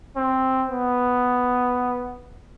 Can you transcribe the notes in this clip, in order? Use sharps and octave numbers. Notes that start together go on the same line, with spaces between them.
C4
B3